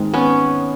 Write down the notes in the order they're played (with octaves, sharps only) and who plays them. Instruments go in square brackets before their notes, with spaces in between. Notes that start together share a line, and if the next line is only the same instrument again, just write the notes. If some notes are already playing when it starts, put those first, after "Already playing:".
Already playing: [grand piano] G#2 D#3 G#3 C4
[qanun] B3 C#4